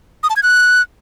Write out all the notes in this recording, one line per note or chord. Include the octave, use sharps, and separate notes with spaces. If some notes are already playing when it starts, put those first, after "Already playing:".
D#6
A5
G#6
F#6